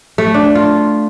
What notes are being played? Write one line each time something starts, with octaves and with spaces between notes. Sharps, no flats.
A3
D4
F4